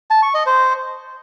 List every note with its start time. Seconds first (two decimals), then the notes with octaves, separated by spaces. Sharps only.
0.11 A5
0.22 C#6
0.34 D#5
0.46 C5